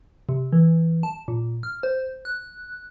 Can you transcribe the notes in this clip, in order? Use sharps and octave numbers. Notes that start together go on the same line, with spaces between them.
C3
E3
A5
A#2
F6
C5
F#6